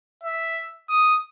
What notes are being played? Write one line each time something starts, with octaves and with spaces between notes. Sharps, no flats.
E5
D#6